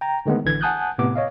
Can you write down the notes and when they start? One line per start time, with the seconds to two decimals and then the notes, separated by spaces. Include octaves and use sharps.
0.01 G5 A#5
0.26 D3 D#3 G#3 A3 B3
0.45 A1 D3 E3 G#6
0.61 F#5 G#5 A5 D#6 F#6 G6
0.98 A2 C3 B3 D6
1.16 C#5 D#5 F5